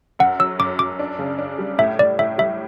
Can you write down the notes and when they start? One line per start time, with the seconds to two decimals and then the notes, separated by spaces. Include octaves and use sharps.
0.19 F#2 F#5
0.39 F#3 E6
0.59 F#2 D6
0.79 F#2 D6
0.99 D4
1.19 C#3
1.39 D4
1.58 G3
1.78 A2 E5
1.99 A2 D5
2.19 A2 E5
2.38 G3 E5